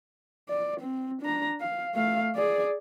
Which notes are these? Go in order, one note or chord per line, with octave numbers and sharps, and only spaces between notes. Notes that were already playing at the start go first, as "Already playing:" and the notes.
D5
C4
D4 A#5
F5
A3 F5
G#4 D5